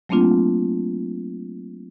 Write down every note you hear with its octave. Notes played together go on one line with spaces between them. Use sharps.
F#3 A3 A#3 C4 D4 F4